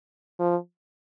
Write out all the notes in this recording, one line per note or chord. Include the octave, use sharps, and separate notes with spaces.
F3